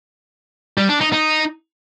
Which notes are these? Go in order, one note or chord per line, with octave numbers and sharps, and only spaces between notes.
G3
D4
D#4
D#4